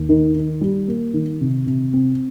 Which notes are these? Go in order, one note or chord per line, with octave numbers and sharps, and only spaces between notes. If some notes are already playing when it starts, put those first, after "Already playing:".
Already playing: D#2
D#3
D#3
G3
A#3
D#3
C3
C3
C4